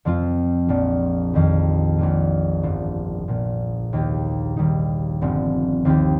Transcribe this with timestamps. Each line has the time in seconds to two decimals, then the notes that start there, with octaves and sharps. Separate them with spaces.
0.05 F2 F3 C4 F4
0.69 A#1 A#2 F3
1.33 F2 D#3 G3
1.98 A#1 A#2 A#3 F4
2.63 G1 G2 F3
3.28 A#1 A#2 A#3
3.93 D#2 D#3 A#3 G4
4.57 D#2 D#3 G3 D#4
5.21 G1 G2 F3 C4
5.85 D#2 D#3 C4 G4